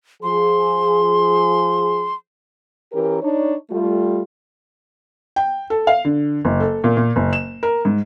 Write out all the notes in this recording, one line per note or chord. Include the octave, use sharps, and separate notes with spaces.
F3 G#4 C6
E3 C#4 G4 A#4
D4 D#4 C#5
G3 A3 F4
G5
A4
F5
D3
F#1
A4
A#2
A#2
F#1
E7
A#4
G#2